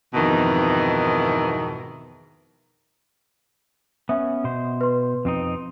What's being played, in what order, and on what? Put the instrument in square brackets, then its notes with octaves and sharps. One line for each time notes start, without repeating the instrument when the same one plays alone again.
[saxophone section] F2 G#2 B2 D#3 E3
[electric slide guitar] B3 C#4 [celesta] E5
[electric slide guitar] B2 C5
[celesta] B4 C6
[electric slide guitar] F2 C4 D#4